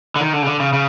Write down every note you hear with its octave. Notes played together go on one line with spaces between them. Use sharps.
D3
D#3
D3
C#3
D3
C#3
C#3